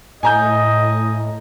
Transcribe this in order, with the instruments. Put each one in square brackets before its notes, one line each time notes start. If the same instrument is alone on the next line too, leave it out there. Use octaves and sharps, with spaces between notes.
[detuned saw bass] A2 [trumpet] D#5 [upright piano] G#5 A#5 G6